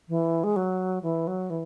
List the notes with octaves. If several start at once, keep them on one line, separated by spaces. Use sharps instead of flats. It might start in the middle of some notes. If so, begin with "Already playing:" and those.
E3
G#3
F#3
E3
F#3
E3